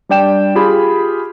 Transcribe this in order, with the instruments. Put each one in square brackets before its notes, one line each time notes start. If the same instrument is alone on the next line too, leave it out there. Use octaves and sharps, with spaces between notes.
[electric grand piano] G3 D4 D5 G5 E7
F4 G4 G#4 B5